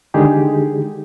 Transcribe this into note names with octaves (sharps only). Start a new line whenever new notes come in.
D3 D#3 G#3 D#4 G4 G#4